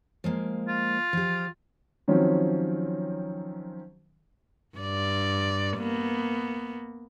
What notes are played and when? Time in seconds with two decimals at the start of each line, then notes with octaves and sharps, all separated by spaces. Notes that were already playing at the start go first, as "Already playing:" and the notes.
0.24 F3 G#3 A#3
0.68 F4
1.13 F3 G4
2.08 D#3 F3 F#3 C4 C#4
4.77 G2 D5
5.78 A#3 B3